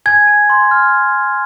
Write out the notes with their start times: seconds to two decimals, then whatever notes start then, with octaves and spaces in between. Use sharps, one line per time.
0.06 G#5 G#6
0.27 G#5
0.50 C6
0.71 F6